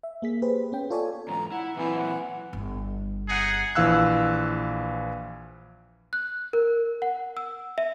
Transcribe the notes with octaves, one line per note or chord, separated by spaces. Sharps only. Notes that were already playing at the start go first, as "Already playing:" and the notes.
E5
A#3 G#4 B6
G4 G#4 B4 C5
B3 C#4 G5
F4 A4 C#5 D5 G#5
E2 G#2 A#5
E4 F#5
A#2 E3 F#3 C4
F#5
G1
D#4 G#4 F#5
A#1 E3 F5 E6 F#6
F#6
A#4
F#5
E6
E5